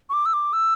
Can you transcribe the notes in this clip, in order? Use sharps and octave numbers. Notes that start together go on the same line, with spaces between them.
C#6
D6
E6
D6
E6